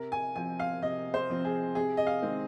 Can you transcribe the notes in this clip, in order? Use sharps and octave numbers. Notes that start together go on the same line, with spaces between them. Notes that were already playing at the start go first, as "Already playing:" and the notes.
Already playing: C3 A#4
G#5
F3 C4 G#5
F5
C3 D#5
C5
F3 C4
G#4
C3 G#4
D#5
F5
D#3 G#3 C4